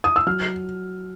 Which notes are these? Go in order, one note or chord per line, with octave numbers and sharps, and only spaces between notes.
D#6
E6
F#3 F6